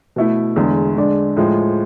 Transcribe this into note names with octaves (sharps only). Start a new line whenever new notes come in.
B2 A3 E4
E2 D3 G#3
D3 G#3 D4
A2 F3 G#3